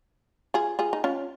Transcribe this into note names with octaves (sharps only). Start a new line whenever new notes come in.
F4 G#4
F4 G#4
D#4
C#4 F4